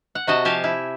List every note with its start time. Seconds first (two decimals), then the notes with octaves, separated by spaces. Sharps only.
0.15 F#5
0.27 C3 F#4 D#5 A5
0.45 F3 G4 F5 G#5 A5
0.64 E4